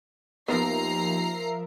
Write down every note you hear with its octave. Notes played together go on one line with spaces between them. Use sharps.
D#2 F3 B3 A#4 B4 E5 A#5 C7